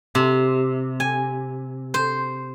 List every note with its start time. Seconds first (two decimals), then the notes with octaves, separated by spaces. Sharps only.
0.15 C3
1.00 G#5
1.94 C5